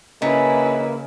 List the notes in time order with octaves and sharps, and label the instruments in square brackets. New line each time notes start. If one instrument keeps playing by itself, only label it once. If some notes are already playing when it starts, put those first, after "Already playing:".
[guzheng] C#3 [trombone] A#3 [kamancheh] E4 B4 [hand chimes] D#5 A#5 B6